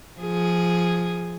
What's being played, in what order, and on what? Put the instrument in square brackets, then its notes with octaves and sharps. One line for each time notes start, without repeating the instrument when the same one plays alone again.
[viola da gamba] F3 G#4